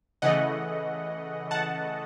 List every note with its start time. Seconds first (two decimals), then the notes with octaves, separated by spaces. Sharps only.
0.22 C#3 E3 A3 D#5 F#5
1.51 F#5 A5